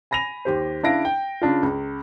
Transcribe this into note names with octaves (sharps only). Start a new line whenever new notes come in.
G#5 B5 A#6 D#7 F7
D#2 G4 C5
C#3 D4 E4 F5 A#6 D7
G5
C#3 D4 F4
C#2